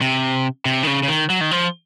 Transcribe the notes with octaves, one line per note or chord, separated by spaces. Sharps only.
C3
C3
D#3
C#3
C#3
D#3
F#3
D#3
F3